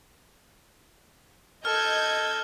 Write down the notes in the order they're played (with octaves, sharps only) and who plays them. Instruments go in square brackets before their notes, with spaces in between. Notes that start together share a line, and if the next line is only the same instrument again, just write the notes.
[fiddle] A4 [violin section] D#5 G6 G#6 [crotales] F6